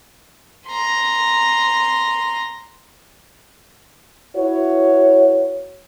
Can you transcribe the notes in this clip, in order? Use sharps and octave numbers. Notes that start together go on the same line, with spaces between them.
A#5 C6
E4 F#4 B4 C#5